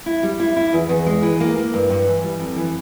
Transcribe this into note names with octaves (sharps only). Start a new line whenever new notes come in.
E4
G3
E4
E4
E2
E2
G#3
E3
A#3
A#3
G2
G2
E3
G3
F2
E3